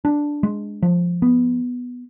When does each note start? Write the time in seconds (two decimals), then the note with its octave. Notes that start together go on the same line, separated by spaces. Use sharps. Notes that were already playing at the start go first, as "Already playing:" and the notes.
0.05 D4
0.43 G#3
0.82 F3
1.22 B3